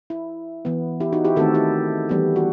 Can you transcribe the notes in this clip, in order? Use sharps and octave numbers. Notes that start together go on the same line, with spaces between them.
E4
E3 B3
E4 G4
D#4 F#4
E4 G4
D#3 A3 C4 F#4 A4
E4 G4
E3 G3 B3
F#4